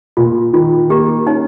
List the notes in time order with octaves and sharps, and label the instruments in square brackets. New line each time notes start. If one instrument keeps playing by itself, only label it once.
[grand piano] A#2 [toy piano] F4
[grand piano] D#3 [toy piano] F4
[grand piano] A#3 [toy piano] G4
[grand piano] C#4 [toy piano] D#4